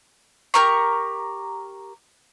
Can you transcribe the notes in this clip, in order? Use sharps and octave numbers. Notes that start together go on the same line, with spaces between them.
G4 A#4 A#5 C#6